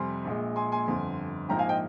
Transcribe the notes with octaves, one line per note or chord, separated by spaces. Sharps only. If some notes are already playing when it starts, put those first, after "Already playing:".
Already playing: F2 C3 G3 G#5 C6
A#1 A#2 G#3
G#5 C6
G#5 C6
G1 F2 D3
A#1 G#2 F3 A#3 G5 A#5
F5 G#5
D#5 G5